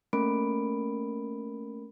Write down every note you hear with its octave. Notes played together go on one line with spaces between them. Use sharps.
A3 A#3 C#4 A#4 B5 D7